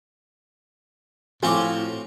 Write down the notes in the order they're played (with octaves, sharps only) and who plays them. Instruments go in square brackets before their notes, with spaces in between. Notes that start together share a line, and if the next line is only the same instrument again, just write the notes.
[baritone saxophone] A2 [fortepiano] F3 [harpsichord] C4 F4 F#4 [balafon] G#5 D6